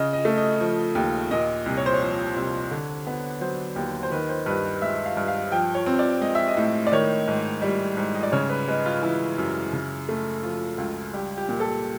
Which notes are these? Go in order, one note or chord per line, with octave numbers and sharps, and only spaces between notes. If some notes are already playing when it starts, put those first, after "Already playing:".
Already playing: C#3 D#5
D#5
A3
D#5
F3
D#2
A#2 D#5
C2
C#5
C5
C#5
F3
C2
D3
B3
F#3 C5
D#2
C5
D#3 B4
C5
G2 B4
G#3 E5
F5
G2
F5
F3 G5
C#5
C4
D5
G#3 D#5
E5
D#5
A2
D5
D#3 C#5
G#2
G3
G#2
D#5
D5
C#3 C#5
B4
G#3 B4
F4
E3 E4
F#2
C#3
A3
F3 F4
C#2
G3 G4
G4
A#2
A4